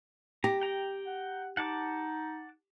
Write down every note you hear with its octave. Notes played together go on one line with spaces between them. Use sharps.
G4 A#5
G5 A#5
F#5
D#4 F#5 A5 D6